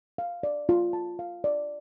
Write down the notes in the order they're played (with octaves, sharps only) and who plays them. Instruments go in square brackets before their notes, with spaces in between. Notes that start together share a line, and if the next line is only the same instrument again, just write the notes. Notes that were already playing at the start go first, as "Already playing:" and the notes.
[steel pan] F5
D5
F4
A5
F5
D5